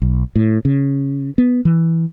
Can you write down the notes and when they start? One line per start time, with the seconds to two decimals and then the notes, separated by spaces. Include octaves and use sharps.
0.02 B1
0.36 A2
0.65 C#3
1.38 B3
1.65 E3